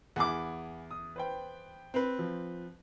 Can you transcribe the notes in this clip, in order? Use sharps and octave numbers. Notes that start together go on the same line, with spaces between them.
E2 F#5 G#5 B5 D6
D#6
B4 C5 G5
C4 B4
F3